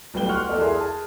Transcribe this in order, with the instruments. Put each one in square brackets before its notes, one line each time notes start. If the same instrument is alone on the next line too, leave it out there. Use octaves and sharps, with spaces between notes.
[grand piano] D1 B1 G3 B4 G5 G7
F#5 C6 C#6 F6 F#6
E2 A4 D5
E4 G#4 A#4 C6
G#4 A5